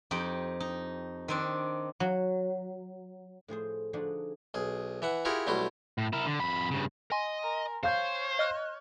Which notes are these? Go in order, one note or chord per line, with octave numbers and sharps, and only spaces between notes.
F2 D#4 G4 G5
D#4
D#3 C4 D4
F#3
A2 F3 G#4 C5
D3 F3 D4 D#4 F#4 G#4
B1 G#4
E3 E5 F#5
E4 F4 G4 G#4 A#4 F#5
B1 G3 A3 E4 F#4 C6
A2
E4 A#4
D3
F2 B5
G2 C#3
D#5 G#5 C6
A#4
C5 C#5 F5 G6
D#5 F6 F#6